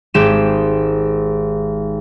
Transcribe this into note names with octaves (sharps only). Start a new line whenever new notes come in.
G#1 G#3 G4 E7